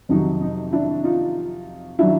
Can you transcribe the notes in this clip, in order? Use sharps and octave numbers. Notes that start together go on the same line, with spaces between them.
F2 C3 D#3 F#3 D#4
D#4
D4 E4
D#4 F4
D#3 F#3 D4 E4